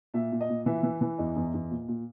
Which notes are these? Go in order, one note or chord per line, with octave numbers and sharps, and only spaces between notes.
A#2 E5
A#2
D#5
A#2
E3 E5
E3
E3
E2 D#5
E2
E2
A#2
A#2